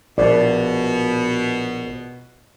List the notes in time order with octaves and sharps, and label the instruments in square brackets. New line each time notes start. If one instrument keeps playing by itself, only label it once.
[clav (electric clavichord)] A#1 [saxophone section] B2 [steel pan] D5